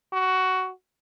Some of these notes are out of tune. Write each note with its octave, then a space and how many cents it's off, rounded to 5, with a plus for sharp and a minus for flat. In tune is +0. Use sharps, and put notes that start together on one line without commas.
F#4 +15